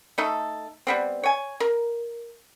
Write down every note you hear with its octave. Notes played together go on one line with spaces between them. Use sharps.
A3 D#4 A4
G3 B3 C4
C#5 G#5
A#4